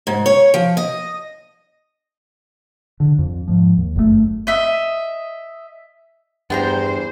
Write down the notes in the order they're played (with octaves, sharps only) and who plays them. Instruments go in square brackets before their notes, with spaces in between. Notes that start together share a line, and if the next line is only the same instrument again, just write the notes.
[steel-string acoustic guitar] G#2
C#5
F3
D#5
[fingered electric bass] D3
F2
G#2 F3
D#2
G1 F#2 A2 A3
[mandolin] D#5 E5
[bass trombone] E2 [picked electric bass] G2 [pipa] B3 G5 A#5 [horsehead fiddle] C5